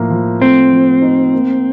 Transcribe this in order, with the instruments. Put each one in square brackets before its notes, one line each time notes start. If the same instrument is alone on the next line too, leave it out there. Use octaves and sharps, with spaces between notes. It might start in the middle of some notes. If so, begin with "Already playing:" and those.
Already playing: [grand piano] A2 F3 A#3
F3
[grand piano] A3 [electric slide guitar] C4
[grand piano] F3
D#4
A#3